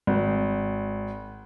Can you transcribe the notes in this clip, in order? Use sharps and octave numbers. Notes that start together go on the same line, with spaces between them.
G#1